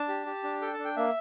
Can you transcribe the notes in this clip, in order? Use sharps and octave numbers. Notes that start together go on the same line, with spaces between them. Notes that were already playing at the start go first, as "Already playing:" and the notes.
Already playing: D4 A5
G4
G4
D4
A4 G5
D4 A5
G5
A#3 E5